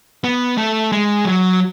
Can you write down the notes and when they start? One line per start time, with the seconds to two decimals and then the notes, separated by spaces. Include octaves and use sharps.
0.24 B3
0.58 A3
0.92 G#3
1.25 F#3